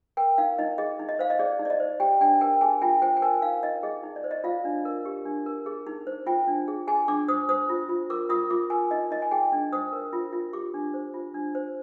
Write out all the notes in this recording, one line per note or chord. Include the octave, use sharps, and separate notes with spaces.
A#4 G5
D#4 F5
D#4 D#5
G#4 D#5
D#4
D#5
C5 F5
D#5
G#4 D5
D#4
D5
D#5
C5
G4 G5
D4 G5
A#4 G5
G#4 G#5
F4 G5
C5 G5
G5
A#4 G#5
D#4 F5
D#4 D#5
G#4 D#5
D#4
D5
C5
D#5
F4 F5
D4
A#4
G4
D4
A#4
G#4
D#4
C5
F4 G5
D4
G#4
G#4 G#5
D4 D6
C5 D#6
C5 D#6
F4
F4
A#4 D6
F4 D#6
F4 D6
A#4 G#5
D#4 D#5
D#4 D#5
G#5
G#4 G5
D4
C5 D#6
A#4
F4
F4
G4 D6
D4
C5
F4
D4
C5